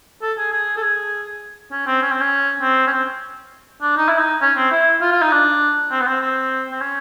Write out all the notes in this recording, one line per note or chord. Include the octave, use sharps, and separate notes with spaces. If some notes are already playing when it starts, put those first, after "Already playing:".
A4
G#4
G#4
A4
G#4
C#4
C4
C#4
C4
C#4
C4
C#4
C4
D4
D#4
E4
D#4
C#4
C4
E4
F4
F4
D#4
D4
C4
B3
C4
C4
C4
C#4